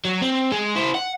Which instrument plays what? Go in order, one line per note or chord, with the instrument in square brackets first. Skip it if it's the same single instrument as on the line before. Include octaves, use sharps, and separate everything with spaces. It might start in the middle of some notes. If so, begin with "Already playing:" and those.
[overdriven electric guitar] F#3
C4
G#3
E4 C5
F#5